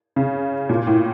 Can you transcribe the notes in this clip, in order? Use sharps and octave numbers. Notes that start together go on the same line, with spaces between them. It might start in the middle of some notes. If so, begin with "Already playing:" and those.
C#3
A#2
A2